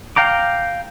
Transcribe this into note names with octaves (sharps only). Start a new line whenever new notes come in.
F5 G5 A#5 D6